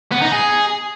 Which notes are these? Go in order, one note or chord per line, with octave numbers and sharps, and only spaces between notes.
B3
D#4
G#4